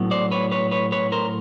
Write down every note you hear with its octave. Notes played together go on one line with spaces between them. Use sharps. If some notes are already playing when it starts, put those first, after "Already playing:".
Already playing: A2 F#3 B3
C5 D5
B4 C#5
B4 C#5
B4 C#5
B4 C#5
A#4 C5